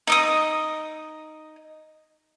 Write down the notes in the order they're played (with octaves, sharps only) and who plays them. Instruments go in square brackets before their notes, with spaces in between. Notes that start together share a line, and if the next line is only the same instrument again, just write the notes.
[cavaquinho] D#4 D#5 D#6